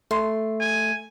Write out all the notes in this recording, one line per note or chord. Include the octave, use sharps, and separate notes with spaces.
A3 C6
G#5